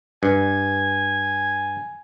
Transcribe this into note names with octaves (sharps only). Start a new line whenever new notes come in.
G2 G#5